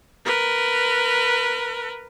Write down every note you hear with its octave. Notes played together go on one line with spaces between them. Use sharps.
A#4 B4